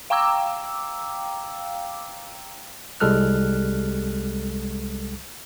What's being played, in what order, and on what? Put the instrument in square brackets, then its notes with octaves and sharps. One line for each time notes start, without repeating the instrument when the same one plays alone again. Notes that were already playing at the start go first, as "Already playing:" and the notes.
[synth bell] F5 G5 A#5 D6 E6
[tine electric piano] C2 G3 G#3 A4 F6 F#6